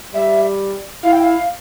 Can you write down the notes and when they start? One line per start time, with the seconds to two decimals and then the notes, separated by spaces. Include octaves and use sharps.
0.14 G3 E5
1.03 E4 F5
1.12 G5
1.22 F5